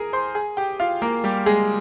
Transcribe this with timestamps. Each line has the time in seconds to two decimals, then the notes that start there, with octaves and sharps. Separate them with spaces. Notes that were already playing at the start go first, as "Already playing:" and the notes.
Already playing: G#4 A#4 G#5 A#5
0.13 C5 C6
0.35 G#4 G#5
0.57 G4 G5
0.80 F4 F5
1.02 A#3 A#4
1.24 G3 G4
1.46 G#3 G#4